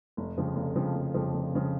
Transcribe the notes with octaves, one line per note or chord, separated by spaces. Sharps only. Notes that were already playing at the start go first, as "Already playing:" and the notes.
F1
F2 C#3 F3
F1
F2 C#3 F3
F1
F2 C#3 F3
F1
F2 C#3 F3